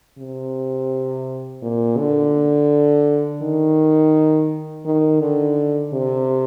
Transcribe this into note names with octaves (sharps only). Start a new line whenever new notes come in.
C3
A#2
D3
D#3
D#3
D3
C3